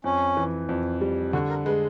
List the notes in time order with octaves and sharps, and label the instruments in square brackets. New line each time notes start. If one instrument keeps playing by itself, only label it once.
[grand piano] F2 [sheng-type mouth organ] C#4
[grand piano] E3
F2
G3
[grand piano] D3 [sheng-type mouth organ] F#4
[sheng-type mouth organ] A#4
[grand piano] G#3 [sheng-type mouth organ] B4